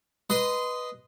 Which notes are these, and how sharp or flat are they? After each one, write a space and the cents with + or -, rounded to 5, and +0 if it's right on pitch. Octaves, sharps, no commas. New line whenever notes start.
B4 -5 D#5 +0 C6 -20